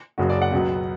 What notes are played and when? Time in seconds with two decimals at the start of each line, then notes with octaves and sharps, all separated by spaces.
0.18 F#1 F#2 C#3 F#3 F#4
0.30 D5
0.42 F#5
0.52 C#2 B2 F#3 B3